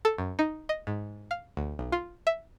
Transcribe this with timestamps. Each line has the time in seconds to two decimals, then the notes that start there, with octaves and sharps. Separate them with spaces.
0.05 A4
0.18 F#2
0.39 D#4
0.69 D#5
0.87 G#2
1.31 F5
1.57 D2
1.79 B1
1.92 F4
2.27 E5